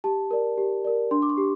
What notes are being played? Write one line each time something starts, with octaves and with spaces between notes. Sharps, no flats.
G4 A5
A#4 D5
G4
A#4 D5
D4 C6
D6
C#6
G4